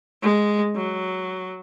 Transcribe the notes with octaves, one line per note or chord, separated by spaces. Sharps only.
G#3
F#3